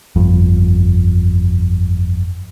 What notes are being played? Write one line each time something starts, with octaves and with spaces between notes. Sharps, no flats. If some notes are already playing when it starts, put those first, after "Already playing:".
G1 F2